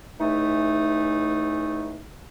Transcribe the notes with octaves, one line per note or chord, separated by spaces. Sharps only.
C#2 E3 A3 D#4